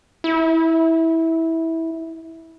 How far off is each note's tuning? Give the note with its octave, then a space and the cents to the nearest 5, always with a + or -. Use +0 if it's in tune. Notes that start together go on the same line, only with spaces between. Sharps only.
E4 -15